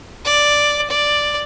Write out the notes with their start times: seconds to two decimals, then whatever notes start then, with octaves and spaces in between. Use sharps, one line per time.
0.25 D5
0.90 D5